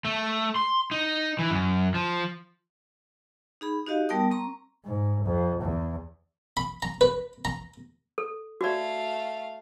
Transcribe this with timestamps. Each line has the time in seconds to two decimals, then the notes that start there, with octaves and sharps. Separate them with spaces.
0.05 A3
0.56 C6
0.91 D#4
1.39 E3
1.50 F#2
1.94 F3
3.61 D#4 G#4 B5
3.87 D#4 F#4 G4 D#5 F5
4.09 G3 B3 A#4 G5 A5 D#6
4.31 C4 A#5 C#6
4.85 G#2
5.24 F2
5.61 E2
6.57 B5
6.82 A#5
7.01 B4
7.45 A#5
8.18 A4
8.61 A3 F#4 D5 F5